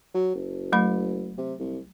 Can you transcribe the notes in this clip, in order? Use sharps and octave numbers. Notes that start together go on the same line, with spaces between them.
F#3
F#1
F#3 A3 B5
C3
C2